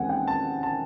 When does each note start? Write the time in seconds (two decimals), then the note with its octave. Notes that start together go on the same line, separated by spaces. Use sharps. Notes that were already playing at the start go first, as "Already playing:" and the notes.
Already playing: D#2 C#3 E3 G#3 C4 F#5 G#5
0.09 G5
0.27 A5
0.63 A5